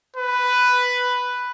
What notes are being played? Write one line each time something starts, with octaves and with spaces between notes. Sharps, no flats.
B4